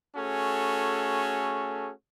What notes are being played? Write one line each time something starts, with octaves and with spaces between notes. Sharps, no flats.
A3 C#4 F#4 G#4 A4